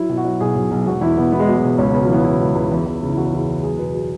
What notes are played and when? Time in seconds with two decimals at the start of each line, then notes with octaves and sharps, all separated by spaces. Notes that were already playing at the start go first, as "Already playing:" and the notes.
Already playing: F#3 E4
0.09 B2
0.17 F#4
0.24 F#3
0.40 B1 G#4
0.55 B1
0.71 B1
0.86 E1 F#4
1.01 E2 E4
1.17 E1 B3
1.32 E3 B3
1.40 G#3
1.48 E2 F#3
1.54 G#3
1.64 E1
1.78 C#2 C#4
1.90 C#3 B3
2.02 F#3
2.09 E3 B3
2.24 C#3 E4
2.41 C#2
2.55 C#2
2.72 E2
2.86 E2
3.02 C#3
3.09 E4
3.17 E2 F#4
3.26 C#4
3.32 E2 E4
3.48 E2
3.63 F#3 G#4
3.78 B2 B4
3.94 F#3